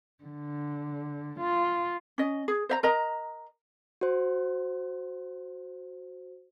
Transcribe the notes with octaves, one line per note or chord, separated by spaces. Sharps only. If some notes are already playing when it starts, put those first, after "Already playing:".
D3
F4
C#4 D#5
G#4
C5 E5 A#5
A#4 D#5 A#5
F#4 C5